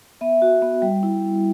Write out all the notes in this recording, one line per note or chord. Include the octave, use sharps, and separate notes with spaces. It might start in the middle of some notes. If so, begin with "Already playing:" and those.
B3 E5
F#4
B3
G3
E4